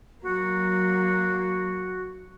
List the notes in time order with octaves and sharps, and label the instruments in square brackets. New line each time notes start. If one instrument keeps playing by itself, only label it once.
[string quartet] F#3 A#3 [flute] F#4